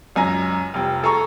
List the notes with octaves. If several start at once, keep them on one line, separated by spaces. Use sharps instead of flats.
C#2 F#2 G#5 A#5 A#6
F1 C2 G5
G#4 A4 G#5 A#5 C#6